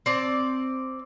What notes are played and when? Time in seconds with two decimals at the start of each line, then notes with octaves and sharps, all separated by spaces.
0.06 C4 D5 A5